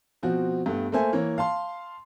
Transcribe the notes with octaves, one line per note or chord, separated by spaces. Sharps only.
B2 F3 C4 F#4
G2 A3 B3
A3 A#3 A4 C5 E5 G#5
E3 A#3 C#5
F5 A5 C6